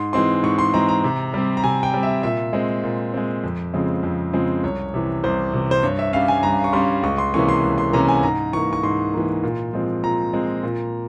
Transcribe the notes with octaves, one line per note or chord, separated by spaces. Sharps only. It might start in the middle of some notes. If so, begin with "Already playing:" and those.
Already playing: G#2 C6
E3 G#3 C4 C6
G#2 C#6
C6
E3 G#3 C4 A#5
A#5
C3
G3 C4
A#5
C3 G#5
G5
G3 C4
E5
A#2 E5
G#3 C4
A#2
G#3 C4
F2
C#3 F3 G#3 C4
F2
C#3 F3 G#3 C4
C2 C#5
C3 E3
C2 C5
C3 E3
C5
G2 C#5
E5
G3 C#4 F5
G#5
G2 A#5
C#6
G3 C#4 C6
C#2 C#6
C6
C3 E3 A#3 C#4 C#6
C6
C#2
C6
C3 E3 A#3 C#4 A#5
G#5
G#2 A#5
E3 A#3 C#6
C#6
G#2 C6
E3 A#3
A#2
F3 G#3 C4
A#2 A#5
F3 G#3 C4
A#2